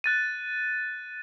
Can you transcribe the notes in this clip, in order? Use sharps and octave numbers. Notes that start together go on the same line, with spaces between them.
F#6 A6 D#7